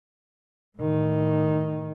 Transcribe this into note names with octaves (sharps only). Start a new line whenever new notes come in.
A2 D#3